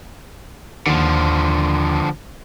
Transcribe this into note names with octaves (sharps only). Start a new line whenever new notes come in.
D#2 D3 F3